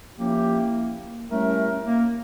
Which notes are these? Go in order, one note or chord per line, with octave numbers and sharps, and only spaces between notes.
F3 A#3 C#4 E4 G4
G3 A3 C#4 E4 A#4
A#3